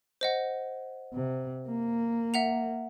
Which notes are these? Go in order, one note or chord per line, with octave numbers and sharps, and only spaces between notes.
C5 D#5 F#5
C3
A#3
E5 F#5 F7